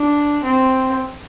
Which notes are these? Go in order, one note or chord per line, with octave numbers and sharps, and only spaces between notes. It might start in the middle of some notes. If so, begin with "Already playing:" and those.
Already playing: D4
C4